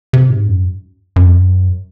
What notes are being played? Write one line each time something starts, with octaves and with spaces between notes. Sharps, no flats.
C3
G#2
F#2
F#2
F2
F#2